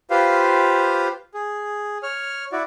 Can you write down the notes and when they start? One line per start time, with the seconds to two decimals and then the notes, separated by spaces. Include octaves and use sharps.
0.10 F4 G4 B4 C5 F5
1.34 G#4
2.03 C#5 F6
2.52 E4 F#4 D5